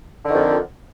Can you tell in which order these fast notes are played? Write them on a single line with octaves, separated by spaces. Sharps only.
D3 D#3 F2